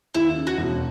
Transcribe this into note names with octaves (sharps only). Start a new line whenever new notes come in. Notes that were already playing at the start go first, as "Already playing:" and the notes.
D#2 E4
C#3
F#4
E1